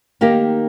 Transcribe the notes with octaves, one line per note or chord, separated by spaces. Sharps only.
D#3 A#3 D#4 G4